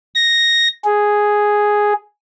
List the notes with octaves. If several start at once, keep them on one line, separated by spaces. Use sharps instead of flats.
A#6
G#4